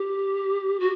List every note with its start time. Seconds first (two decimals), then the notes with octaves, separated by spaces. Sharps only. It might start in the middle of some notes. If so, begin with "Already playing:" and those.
Already playing: G4
0.80 F#4